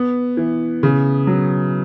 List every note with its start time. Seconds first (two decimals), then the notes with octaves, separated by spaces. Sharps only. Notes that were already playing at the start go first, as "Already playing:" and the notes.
Already playing: B3
0.37 E3
0.83 C#3
1.27 F#3